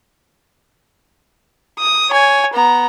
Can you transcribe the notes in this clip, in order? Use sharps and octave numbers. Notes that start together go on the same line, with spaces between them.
D#6
C#5 G#5
B3 A#5